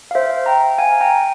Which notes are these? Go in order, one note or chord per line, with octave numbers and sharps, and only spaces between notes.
F5
C5 E5
G5 A#5
F5 G#5
G5 A#5